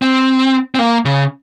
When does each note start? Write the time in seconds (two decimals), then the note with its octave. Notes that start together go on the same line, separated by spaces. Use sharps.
0.02 C4
0.75 C4
0.79 A#3
1.05 C#3